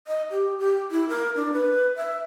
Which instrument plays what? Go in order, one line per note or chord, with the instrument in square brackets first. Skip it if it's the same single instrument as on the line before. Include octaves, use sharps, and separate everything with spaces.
[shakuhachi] D#5
G4
G4
E4
A#4
D4
B4
E5